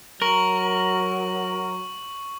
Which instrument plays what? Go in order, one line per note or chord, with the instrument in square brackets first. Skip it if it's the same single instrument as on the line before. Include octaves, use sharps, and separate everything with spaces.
[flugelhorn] F#3 [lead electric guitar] A#4 [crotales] C#6 F#7